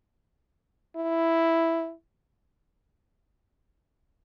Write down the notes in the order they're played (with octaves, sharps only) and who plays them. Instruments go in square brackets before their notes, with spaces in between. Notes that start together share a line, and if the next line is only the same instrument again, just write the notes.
[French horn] E4